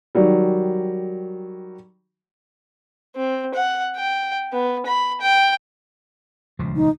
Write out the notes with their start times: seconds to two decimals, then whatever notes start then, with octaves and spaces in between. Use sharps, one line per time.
0.15 D#3 F#3 G3
3.15 C4
3.55 F#5
3.96 G5
4.52 B3
4.86 B5
5.21 G5
6.59 D#1 C#2 F3
6.76 D#4